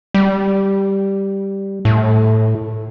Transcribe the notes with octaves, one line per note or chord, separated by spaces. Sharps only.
G3
A2